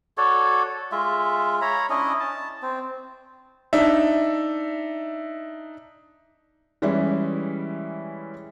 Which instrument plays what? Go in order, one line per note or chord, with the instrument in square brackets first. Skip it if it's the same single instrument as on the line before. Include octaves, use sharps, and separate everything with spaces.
[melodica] F#4 A4 C#5 D5
G#3 F4 E5
C#5 A#5 B5
C#4 D4 E4 D#5
A5
C4
[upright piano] D4 D#4 E5
[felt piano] E3 G3 G#3 C#4 E4